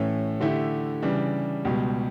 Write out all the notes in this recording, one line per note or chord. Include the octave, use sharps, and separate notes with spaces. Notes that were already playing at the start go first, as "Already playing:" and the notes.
Already playing: A2 E3 A3 C#4
D3 A3 E4 G4
C#3 E3 G3 D4
C#2 B2 G3